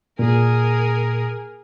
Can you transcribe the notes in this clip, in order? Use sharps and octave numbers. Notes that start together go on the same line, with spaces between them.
A#2 G#4 A#4